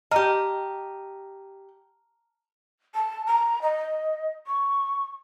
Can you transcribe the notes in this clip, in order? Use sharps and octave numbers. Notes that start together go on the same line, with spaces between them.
G4 D#5 A5 A#5 F6
A5
A#5
D#5
C#6